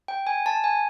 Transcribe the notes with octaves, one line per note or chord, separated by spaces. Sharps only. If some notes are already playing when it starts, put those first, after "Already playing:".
G5
G#5
A5
G#5